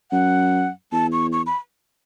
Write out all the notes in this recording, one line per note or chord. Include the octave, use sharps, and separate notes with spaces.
F#2 F#5
E2 A5
C#6
C#6
B5